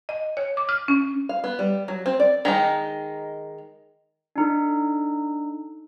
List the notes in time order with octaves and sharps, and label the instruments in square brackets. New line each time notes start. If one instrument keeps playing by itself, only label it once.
[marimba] D#5
C#5
D6
F6
C#4
[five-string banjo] F5
B3
G3
F#3
C4
D5
D#3 G#3 D#4
[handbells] D4 D#4 A4